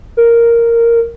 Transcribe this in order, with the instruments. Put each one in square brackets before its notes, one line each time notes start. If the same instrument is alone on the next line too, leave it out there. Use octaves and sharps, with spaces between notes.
[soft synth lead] A#4